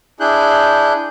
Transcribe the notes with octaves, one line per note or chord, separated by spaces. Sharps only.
D4 E4 G#4 F#6 G6